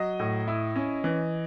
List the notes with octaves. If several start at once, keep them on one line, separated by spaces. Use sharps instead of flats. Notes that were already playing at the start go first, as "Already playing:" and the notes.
Already playing: F#3 D#5
A2
E4
C#4
E3